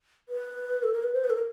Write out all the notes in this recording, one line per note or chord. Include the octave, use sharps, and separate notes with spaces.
B4
A4
A#4
B4
C5
B4
A4
A#4